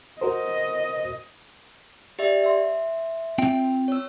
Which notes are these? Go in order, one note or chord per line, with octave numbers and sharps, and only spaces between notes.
F#4 A#4 C5 D#5
G4 D5 E5
E5 C6
C4 F4 G5
C#5 E6